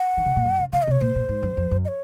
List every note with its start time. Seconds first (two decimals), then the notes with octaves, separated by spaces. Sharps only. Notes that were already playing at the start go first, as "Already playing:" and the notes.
Already playing: F#5
0.17 D#3
0.26 C#3
0.36 A#2
0.45 F#2
0.59 C#3
0.73 C#3 F5
0.83 D#5
0.87 C3 C#5
1.01 A#2 C5
1.16 A#2
1.29 G#2
1.43 F#2
1.57 F2
1.71 F#2
1.85 D#5
1.88 C#5